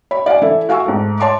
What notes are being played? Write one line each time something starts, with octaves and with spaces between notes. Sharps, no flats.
C#5 B5
D5 F5 F#5 G#5
E3 E4 A4
F#4 F5 G#5 C#6 E6
G#2 A3
C#5 A5 C6 D6